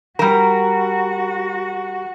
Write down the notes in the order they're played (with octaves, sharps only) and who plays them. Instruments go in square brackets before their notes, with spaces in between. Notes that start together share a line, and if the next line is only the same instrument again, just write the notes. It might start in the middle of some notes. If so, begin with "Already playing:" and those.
[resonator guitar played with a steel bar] G3 A#4 [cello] F#4 [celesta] A#5